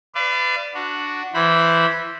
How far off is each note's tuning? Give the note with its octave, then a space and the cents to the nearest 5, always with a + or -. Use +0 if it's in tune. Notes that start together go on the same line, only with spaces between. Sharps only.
B4 +25 D5 +0 F5 -40
D4 +0 F#4 +0
E3 +10 C5 +0 B5 -15